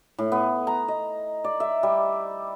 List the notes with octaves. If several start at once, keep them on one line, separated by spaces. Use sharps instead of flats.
A2
B3
A#5
D#5
D5
E5
G3